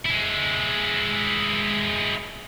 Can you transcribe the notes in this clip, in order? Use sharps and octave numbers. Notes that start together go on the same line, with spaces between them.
G#3 E4